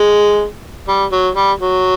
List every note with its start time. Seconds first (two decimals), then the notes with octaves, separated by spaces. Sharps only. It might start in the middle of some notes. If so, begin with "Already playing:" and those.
Already playing: G#3
0.88 G3
1.12 F#3
1.35 G3
1.60 F#3